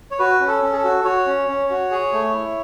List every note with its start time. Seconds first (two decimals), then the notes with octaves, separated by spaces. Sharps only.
0.11 C#5
0.19 F#4 B4
0.40 C#4
0.48 A4
0.62 C#4
0.72 G#4
0.77 A4
0.84 F#4
1.05 F#4 C#5
1.26 C#4
1.48 C#4
1.70 F#4
1.91 G#4
2.13 A3
2.33 E4